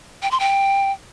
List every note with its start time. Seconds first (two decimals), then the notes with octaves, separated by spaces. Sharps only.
0.22 G5
0.31 C6
0.40 G5